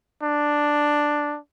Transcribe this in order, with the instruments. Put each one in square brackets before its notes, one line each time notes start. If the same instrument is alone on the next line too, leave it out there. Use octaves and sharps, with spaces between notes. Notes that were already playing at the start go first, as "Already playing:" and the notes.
[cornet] D4